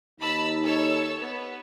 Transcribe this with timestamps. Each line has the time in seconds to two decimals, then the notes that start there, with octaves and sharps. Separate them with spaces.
0.20 D#2 D#4 A5 B5 E6
0.61 A4 C#5 E6
1.19 B3